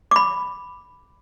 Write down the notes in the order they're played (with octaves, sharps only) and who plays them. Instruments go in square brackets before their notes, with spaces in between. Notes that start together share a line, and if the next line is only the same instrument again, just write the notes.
[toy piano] B5 D6